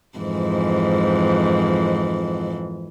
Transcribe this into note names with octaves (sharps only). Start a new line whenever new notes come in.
F2 G#2 E3